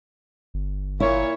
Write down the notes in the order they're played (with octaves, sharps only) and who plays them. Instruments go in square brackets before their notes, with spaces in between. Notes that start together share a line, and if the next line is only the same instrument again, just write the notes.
[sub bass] G1
[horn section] A#2 C#5 [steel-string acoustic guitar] E4